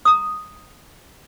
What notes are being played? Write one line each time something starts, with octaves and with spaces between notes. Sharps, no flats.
A#5 D#6